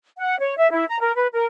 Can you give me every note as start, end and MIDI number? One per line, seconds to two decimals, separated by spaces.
0.18 0.35 78
0.39 0.56 73
0.57 0.68 76
0.70 0.85 64
0.88 0.98 82
1.00 1.13 70
1.15 1.27 71
1.33 1.45 70